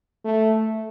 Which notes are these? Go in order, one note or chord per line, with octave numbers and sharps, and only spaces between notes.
A3